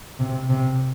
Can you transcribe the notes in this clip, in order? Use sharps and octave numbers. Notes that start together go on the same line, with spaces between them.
C3
C3